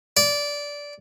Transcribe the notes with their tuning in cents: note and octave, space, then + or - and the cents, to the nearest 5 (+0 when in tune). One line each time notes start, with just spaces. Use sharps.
D5 -15